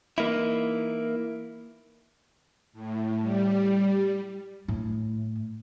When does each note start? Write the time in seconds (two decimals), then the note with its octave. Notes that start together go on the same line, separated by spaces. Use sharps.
0.18 E3 A#3 D#4 E4
2.73 A2
3.21 G3
4.68 A2